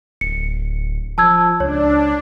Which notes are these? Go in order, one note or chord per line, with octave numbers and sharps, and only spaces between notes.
D1 C#7
F3 A5 E6 G#6
C#2 D4 C#5